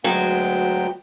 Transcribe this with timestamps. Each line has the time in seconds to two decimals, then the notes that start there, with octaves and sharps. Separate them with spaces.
0.04 D2 F#3 G#3 B3 G5